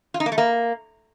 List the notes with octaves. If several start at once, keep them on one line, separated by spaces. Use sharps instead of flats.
F4
D#4
A#3
A3
A#3